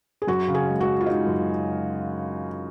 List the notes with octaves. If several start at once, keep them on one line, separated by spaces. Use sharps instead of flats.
G#4
F#2 F#4
C#3
G#4
G#3
F#4
F#2
F4
G#3 D#4
F#2